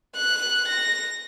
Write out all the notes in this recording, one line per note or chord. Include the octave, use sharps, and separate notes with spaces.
F#6
A#6